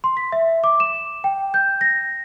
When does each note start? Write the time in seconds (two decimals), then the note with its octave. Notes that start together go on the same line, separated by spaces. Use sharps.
0.04 C6
0.17 B6
0.32 E5
0.64 D6
0.80 E7
1.24 G5
1.54 G6
1.81 A#6